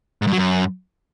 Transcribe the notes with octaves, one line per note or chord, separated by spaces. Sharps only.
G#2
G2
F#3
F#2